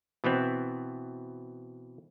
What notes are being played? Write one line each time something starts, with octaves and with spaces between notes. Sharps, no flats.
B2 E3 B3 C4